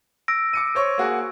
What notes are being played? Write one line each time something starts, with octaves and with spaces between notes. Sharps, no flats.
E6 A#6 D7
D6 C#7 D#7
C5 C#5 C#6
A#3 F#4 G#4